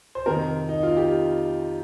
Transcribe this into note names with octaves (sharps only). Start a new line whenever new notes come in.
C5
F2 C3 D#3 A#4
D#4
F4
G4